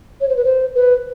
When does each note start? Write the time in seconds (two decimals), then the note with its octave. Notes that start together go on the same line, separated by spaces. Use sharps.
0.21 C#5
0.29 C5
0.36 B4
0.45 C5
0.75 B4